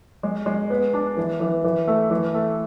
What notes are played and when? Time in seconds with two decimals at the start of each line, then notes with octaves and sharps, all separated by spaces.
0.23 G#3
0.46 G#3
0.70 B3
0.93 D4
1.17 E3
1.40 E3
1.64 E3
1.88 A3
2.10 E3
2.34 A3